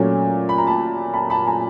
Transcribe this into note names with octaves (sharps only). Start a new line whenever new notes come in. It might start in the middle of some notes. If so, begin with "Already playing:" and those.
Already playing: A#2 F#3 A3 C#4
B5
A#5
A5 B5
A5 B5
A5 B5
G#5 A#5